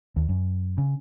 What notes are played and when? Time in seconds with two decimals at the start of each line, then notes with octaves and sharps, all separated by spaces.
0.16 D#2
0.29 F#2
0.78 C#3